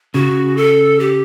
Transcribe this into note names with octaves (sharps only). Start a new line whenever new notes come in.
C#3 F#4
A4
G4